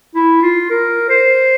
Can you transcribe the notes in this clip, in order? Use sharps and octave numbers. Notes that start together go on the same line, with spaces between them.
E4
F4
A#4
C5